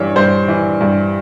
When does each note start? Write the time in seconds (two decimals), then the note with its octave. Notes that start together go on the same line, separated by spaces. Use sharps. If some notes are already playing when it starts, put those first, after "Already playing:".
Already playing: G2 E3 C#5
0.16 G2 C5
0.48 E3
0.81 G2